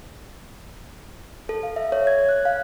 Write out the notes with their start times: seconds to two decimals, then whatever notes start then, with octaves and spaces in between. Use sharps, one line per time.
1.49 A4
1.63 F5
1.76 E5
1.92 C#5
2.07 G#6
2.29 F#6
2.45 F5